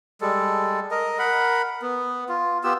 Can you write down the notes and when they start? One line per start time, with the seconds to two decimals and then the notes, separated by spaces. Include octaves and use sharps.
0.21 G3 G#3 A4
0.91 A#4 D#5
1.19 A#4 F#5 B5
1.82 B3
2.29 F4
2.64 B3 F4 G4 E6